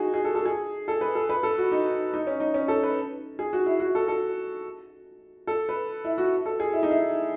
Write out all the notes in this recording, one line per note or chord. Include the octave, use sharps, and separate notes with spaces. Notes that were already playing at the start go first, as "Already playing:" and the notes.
Already playing: D#4 F#4 G#4
G#4
A4
A4
G#4
A4
B4
A4
B4
A4
F#4
D#4
D#4
C#4
D#4
C#4
A4
B4
G#4
F#4
E4
F#4
A4
A4
A4
B4
E4
F#4
A4
G#4
E4
D#4
E4